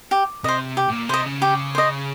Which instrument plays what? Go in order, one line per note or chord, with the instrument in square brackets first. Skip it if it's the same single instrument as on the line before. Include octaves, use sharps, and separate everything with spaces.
[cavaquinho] G4
[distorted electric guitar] C3 [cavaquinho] C5 D#5
[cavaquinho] G4
[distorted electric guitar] A2
A#2
[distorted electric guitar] C3 [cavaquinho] C5 D#5
[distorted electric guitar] C#3
[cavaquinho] G4
C5 D#5